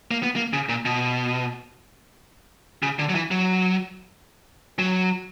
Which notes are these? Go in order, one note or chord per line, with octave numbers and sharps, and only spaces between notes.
A#3
B3
A#3
C#3
A#2
B2
C#3
D3
F#3
E3
F#3
F#3